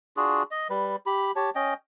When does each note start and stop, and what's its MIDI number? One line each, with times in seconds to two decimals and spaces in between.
0.17 0.43 62
0.17 0.43 65
0.17 0.43 66
0.17 0.43 68
0.51 0.68 75
0.70 0.96 55
0.70 0.96 71
1.06 1.32 67
1.06 1.32 83
1.36 1.50 67
1.36 1.50 73
1.36 1.50 81
1.55 1.74 61
1.55 1.74 75
1.55 1.74 79